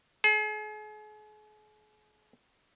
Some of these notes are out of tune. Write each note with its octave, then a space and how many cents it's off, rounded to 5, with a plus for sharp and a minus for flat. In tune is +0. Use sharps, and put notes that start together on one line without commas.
G#4 +40